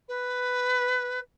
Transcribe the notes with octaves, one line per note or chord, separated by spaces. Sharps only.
B4